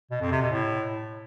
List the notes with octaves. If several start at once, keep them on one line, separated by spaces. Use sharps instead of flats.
B2
F2
C3
B2
A2